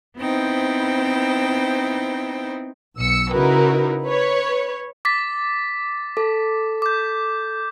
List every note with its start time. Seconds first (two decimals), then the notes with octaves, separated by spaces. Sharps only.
0.19 B3 C4 D#4 E4 C5 G5
2.97 B1 E6 C#7
3.32 C#3 D#4 E4 F#4 A#4 B4
4.05 B4 C#5
5.05 D6 A6 B6
6.17 A4 D6
6.82 D6 G6